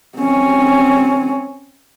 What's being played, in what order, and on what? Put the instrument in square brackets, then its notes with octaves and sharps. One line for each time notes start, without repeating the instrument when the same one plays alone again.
[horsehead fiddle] C4 C#4